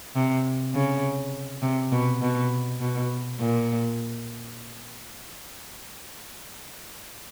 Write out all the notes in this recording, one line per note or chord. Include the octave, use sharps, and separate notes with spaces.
C3
C#3
C3
B2
B2
B2
A#2